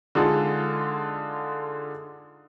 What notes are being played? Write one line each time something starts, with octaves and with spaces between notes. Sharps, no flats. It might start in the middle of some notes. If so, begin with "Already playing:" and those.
D3 G#3 D#4 F4 G#4 A4